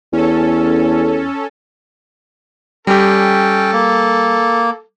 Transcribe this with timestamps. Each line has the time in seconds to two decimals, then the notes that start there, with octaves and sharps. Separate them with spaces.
0.13 E2 C#4 A4
2.87 G3 C#4 G4 A4 G5
3.73 A#3